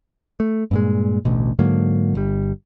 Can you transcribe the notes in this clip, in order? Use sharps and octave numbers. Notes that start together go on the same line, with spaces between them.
A3
G2 A#2 G#3
A1 D2 B2
G#2 D3 F#3 A#3
G1 G3